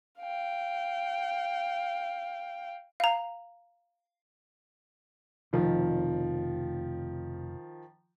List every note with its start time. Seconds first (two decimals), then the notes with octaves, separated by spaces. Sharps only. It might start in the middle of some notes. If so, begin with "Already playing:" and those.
0.20 F5 G5
3.00 F5 A#5
5.53 F1 F2 B2 D#3 F3